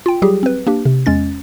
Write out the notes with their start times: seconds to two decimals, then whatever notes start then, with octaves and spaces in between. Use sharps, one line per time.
0.06 F4 G5
0.22 F#3 G3 G4 G#4
0.43 C4 B4
0.67 A#3 D4 G4
0.85 C3
1.06 E2 G#3 C#4 A6